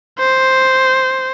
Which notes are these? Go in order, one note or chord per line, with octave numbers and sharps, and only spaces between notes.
C5